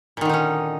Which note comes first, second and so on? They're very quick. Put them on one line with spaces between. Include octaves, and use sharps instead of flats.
A#2 D#3 D3 D#4 C#4